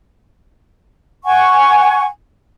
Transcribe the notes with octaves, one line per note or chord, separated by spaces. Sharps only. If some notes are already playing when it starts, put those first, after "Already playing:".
F#5 G#5 C#6